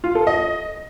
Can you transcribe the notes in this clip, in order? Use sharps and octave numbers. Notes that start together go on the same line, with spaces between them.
F4
A4
D#5